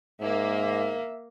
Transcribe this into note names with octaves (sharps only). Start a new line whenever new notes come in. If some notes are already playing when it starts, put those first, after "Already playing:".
G#2 A#3 E5